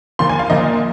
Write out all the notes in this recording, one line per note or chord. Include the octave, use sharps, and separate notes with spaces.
A#2 F3 A#3 C6
G#5
F5
A#2 F3 A#3 D#5